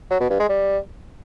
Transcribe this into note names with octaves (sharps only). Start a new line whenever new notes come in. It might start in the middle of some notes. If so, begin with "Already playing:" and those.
F#3
B2
G2
G#3
G3